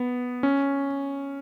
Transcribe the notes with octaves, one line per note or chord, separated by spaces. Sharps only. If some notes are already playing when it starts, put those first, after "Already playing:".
Already playing: B3
C#4